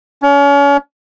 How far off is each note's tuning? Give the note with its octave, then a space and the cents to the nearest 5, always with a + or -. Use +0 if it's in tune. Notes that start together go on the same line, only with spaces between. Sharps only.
C#4 +35